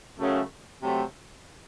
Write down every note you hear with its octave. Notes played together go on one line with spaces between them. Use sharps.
F#2 C#3 A3
C3 F#3 A3 C4